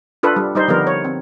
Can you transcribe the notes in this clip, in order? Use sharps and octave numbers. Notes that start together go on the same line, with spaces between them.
D4 F4 A4 B4
G3
G3 D#4 C5
D3 F3 G3 B3 A#4
C#5
C4